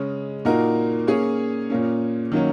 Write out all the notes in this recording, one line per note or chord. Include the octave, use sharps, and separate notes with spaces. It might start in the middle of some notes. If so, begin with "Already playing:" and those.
Already playing: C#3 G#3 C#4
A#2 A#3 D#4 F#4 A#4
A#3 C#4 G#4 C#5
A#2 A#3 C#4
D#3 F#3 A#3 C#4